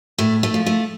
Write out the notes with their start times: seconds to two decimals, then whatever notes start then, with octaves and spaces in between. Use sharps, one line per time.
0.18 A2 A3
0.43 A3
0.54 F3
0.66 A3